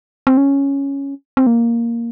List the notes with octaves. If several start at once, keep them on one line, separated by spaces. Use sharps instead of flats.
C4
C#4
C4
A#3